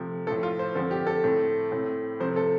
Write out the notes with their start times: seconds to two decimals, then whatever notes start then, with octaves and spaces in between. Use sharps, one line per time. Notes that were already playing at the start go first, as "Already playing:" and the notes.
Already playing: C3 F3 A3
0.27 A2 F3 A3 A4
0.43 F4
0.59 C5
0.75 D3 F3 C4 A4
0.91 G4
1.07 A4
1.24 A2 A3 C4
1.72 A2 A3 C4
2.20 C3 F3 A3 C4 C5
2.36 A4